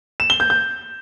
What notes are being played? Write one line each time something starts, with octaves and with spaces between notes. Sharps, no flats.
E7
G7
G6
G6